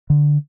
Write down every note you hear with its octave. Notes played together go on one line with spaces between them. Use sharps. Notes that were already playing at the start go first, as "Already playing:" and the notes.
D3